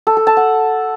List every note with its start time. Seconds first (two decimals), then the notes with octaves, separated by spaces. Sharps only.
0.07 A4
0.17 A4
0.27 A5
0.37 F#5